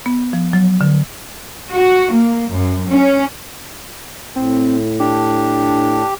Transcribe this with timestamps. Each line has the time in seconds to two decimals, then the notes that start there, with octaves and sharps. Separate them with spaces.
0.06 B3
0.33 F3
0.53 F#3
0.81 D3
1.76 F#4
2.14 A#3
2.52 F#2
2.89 C#4
4.36 A2 C4
4.99 D4 G4